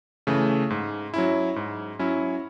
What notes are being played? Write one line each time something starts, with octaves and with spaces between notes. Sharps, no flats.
C#3 E3 A3
G#2
F#3 C#4 E4
G#2
F#3 C#4 E4